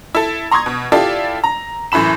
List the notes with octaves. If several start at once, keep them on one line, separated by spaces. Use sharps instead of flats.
E4 A4
A#5 C6 C#6 D#6 G#6
B2
E4 F4 G4 A4 D5
A#5
F#2 A2 E3 B5 E7